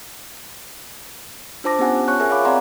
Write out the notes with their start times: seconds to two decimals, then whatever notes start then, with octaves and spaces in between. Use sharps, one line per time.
1.64 D4 F4 C5 A5 D6 A#6
1.79 B3 C#4 G4 F#5 G#5
2.08 F4 C#5 C#6 F#6
2.20 G#4 A#4 E5 G#5
2.31 C#5 F5 B5 D6
2.45 C4 D5 F5 F#5 A#5 C6